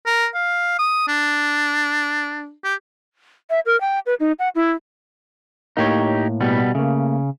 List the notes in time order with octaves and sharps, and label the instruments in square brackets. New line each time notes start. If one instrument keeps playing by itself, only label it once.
[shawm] A#4
F5
D#6
D4
G4
[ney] E5
A#4
G5
B4
D#4
F#5
E4
[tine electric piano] A2 A#3 [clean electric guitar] D#4 G4 C#5
[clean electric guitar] B2 G3 B3
[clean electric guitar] C#3 [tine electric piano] A3 A#3